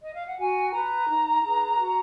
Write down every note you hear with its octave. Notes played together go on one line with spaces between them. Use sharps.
D#5
F5
F#5
F#4 G#5
B4 A#5
D#4
G#4 B4
F#4